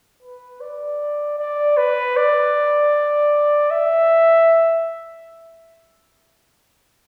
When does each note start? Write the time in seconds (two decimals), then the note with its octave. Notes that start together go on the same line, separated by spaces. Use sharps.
0.23 B4
0.61 D5
1.39 D5
1.77 B4
2.17 D5
3.71 E5